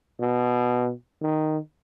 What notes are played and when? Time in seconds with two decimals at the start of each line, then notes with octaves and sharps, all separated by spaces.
0.19 B2
1.22 D#3